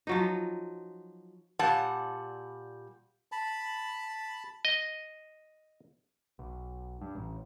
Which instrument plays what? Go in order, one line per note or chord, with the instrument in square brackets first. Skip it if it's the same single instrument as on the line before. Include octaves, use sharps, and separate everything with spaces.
[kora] F3 F#3 D#4
[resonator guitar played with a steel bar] A#2 G3 F#5 A5
[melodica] A5 B5
[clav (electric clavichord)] D#5
[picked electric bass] B1
G2
A1